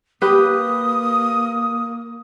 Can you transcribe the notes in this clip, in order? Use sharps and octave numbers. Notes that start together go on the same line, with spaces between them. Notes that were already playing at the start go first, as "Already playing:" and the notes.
A#3 G4 B4 D#6